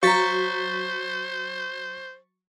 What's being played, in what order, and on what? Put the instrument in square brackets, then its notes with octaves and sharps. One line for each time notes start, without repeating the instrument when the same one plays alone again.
[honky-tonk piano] F#3 [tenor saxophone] C5 [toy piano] F5 A#5 [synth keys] C#6 A6 B6